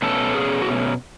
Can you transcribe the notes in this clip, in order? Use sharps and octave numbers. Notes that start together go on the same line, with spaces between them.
B2 A3 C#4 A4
G#4
F#4